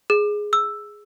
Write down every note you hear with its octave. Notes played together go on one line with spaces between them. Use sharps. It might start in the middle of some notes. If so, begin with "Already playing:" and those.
G#4
E6